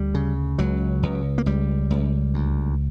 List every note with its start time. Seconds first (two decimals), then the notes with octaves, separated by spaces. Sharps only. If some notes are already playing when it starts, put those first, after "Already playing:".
Already playing: D2 G3
0.14 C#3
0.58 C#2 F#3
1.03 C#2
1.38 A#3
1.46 C#2 G3
1.90 C#2
2.34 D2